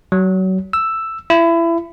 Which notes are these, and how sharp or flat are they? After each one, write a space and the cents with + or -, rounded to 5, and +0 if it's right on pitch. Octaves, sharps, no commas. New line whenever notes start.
F#3 +25
E6 +5
E4 +25